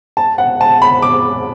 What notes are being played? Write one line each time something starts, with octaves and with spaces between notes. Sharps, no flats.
A5
F#5
A5
B5
D6